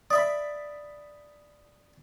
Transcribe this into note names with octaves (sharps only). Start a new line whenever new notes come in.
D5 E5 B5 D#6